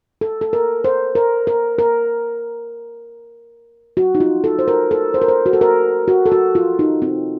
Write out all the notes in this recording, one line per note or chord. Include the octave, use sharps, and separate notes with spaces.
A4
A4
A#4
C5
A#4
A#4
A#4
F#4
D#4
F4
A4
C5
A#4
A4
C5
A#4
C5
F#4
A4
A#4
F#4
A4
F#4
F4
D#4
C4